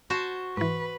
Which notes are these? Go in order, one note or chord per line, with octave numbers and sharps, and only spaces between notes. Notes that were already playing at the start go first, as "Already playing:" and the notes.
F#4 C5 A5
G#2 E3 B4